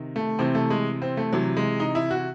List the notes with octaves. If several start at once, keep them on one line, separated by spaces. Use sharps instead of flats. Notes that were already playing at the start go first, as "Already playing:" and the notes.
Already playing: C3 D#3
A3
C3 E3 C4
A3
G#3
C4
A3
C3 E3 F#3
G#3
D#4
E4
F#4